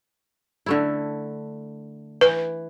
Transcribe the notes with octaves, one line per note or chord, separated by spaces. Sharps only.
D3 A3 E4
E3 B4